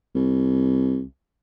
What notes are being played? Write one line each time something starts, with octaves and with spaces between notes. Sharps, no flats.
C2